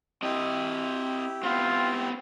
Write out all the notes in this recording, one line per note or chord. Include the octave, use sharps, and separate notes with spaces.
C4 E4 G4 D#5
B3 C4 F4